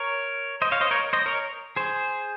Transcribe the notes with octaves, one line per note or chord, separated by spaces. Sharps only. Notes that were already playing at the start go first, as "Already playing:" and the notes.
Already playing: A#4 C#5
C5 D#5
C#5 F5
C5 D#5
A#4 C#5
C5 D#5
A#4 C#5
G#4 C5